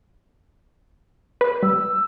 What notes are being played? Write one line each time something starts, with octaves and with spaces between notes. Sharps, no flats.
B4
G3 E6